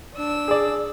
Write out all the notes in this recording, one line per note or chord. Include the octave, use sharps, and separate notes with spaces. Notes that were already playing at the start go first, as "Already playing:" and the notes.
D4 E6
G#4 D5